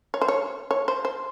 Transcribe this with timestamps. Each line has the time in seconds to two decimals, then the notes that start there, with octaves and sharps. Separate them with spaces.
0.14 C#5
0.22 C5
0.28 C#5
0.71 C#5
0.88 C5
1.05 C5